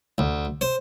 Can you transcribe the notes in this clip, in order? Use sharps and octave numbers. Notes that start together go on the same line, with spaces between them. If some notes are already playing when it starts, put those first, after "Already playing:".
D2
C5